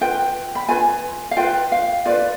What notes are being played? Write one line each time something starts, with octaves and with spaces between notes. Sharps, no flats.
F4 B4 G5
B5
F4 B4 G#5
F5
F4 B4 G5
F5
F4 B4 D5